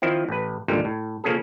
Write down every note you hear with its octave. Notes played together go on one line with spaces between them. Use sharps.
D#3 F3 C4 E4
A1 B4
G#1 C#2 A#2 D3 G3
A2
C#3 F3 A#3 C#4 G#4 A4